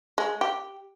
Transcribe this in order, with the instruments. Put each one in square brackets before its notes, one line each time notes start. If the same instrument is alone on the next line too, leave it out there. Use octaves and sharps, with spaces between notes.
[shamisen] G#3
G4